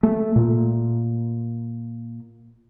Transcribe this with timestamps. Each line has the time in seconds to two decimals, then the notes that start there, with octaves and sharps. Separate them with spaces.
0.03 A3
0.36 A#2